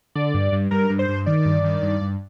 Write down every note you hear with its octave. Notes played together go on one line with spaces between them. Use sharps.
D3 D5
G2
G2
G2 A#4
G2
C5
G2
D#3 D5
G2
D#3
G2
G2